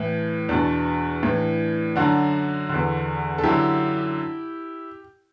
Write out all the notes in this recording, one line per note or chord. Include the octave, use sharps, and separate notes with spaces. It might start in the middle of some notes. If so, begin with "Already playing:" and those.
Already playing: A2 E3
E2 B2 D4
A2 E3
F#2 D3 D4 F#4
E2 D3
A4
F#2 D3 E4 G4